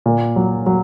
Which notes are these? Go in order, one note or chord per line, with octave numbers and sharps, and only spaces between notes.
A#2
F#3
F#3